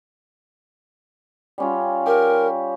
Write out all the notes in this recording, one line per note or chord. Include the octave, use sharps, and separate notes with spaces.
G3 C#4 F4
G4 A#4